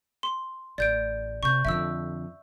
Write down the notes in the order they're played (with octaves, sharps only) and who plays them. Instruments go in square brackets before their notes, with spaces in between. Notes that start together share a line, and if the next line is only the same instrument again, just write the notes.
[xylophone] C6
[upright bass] A1 [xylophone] D5 G6 D7
[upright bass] C3 [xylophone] C#6 G6
[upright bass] F2 D3 [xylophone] E5 E6